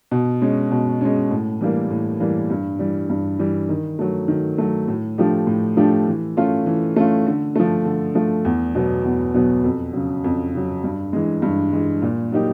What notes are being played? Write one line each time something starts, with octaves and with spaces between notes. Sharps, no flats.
B2
G#3 C#4
B2
G#3 C#4
A2
E3 G3 A#3
A2
E3 G3 A#3
G2
E3 G3
G2
E3 G3
D#3
F#3 A3
D#3
F#3 A3
A2
F3 A3 D4 G4
A2
F3 A3 D4 G4
E3
A3 C#4 F4
E3
A3 C#4 F4
D3
F3 A3
D3
F3 A3
E2
B2 F#3 B3
E2
B2 F#3 B3
F2
C#3 F#3
F2
C#3 F#3
G2
E3 G#3
G2
E3 G#3
A#2
F#3 A#3 D#4 G4